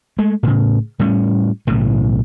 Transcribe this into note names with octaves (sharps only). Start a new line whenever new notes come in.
G#3 A3
A2 C#3
A2 G3 A3 C#4
B1 A2 C#3 E3